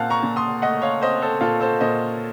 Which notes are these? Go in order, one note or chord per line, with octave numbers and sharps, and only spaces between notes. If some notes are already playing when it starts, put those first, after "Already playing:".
Already playing: A#2 C4 F5 F#5 A5
A#5 C#6
A#2
C6 D#6
A3 D#5 F#5
C#5 F5
C4 C5 D#5
A4 C5
A#2 F4 A4
A4 C5
A#2 C5 D#5